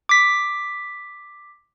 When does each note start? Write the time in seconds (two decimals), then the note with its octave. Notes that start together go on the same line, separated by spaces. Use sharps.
0.09 D6 B6